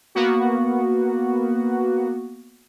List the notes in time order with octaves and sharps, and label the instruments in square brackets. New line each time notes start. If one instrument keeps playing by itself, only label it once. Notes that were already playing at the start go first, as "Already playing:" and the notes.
[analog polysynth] A#3 B3 F#4